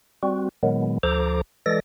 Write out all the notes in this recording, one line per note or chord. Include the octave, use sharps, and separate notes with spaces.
G3 C4 F#4
A#2 D#3 F#3 G#3 B3
D2 F3 A4 C5 A#5 D6
E3 G#3 A4 D5 A#6